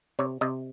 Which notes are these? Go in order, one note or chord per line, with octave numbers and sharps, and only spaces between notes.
C3 C#5
C3 D#5